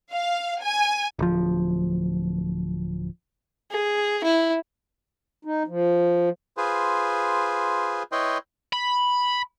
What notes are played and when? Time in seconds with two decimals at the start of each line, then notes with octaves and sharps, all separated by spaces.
0.13 F5
0.63 G#5
1.19 D1 F3
3.71 G#4
4.24 E4
5.45 D#4
5.67 F3
6.57 F4 G#4 B4 C5
8.12 E4 B4 C#5 D#5 G5 C6
8.73 B5